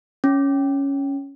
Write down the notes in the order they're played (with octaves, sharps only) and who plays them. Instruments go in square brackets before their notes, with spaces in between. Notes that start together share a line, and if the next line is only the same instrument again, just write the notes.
[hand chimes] C#4